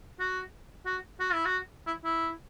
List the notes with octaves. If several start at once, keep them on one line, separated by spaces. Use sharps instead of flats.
F#4
F#4
F#4
E4
F#4
E4
E4